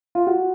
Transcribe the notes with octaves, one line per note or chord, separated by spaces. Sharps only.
F4
F#4